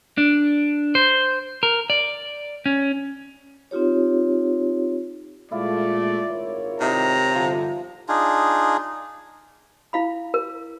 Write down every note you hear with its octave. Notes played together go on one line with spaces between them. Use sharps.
D4
C5
A#4
D5
C#4
C4 D#4 F4 G4 C#5
A#2 G#3 A3 E4 F4 D5
G#1 A#4 C#5
C3 D#4 E4 A#5
G1 D3 F3 C5
D4 D#4 F4 G#4
E4 F5 B5
A#4